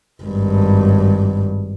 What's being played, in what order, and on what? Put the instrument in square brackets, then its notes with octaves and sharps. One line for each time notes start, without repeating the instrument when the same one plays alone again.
[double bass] G#1 G2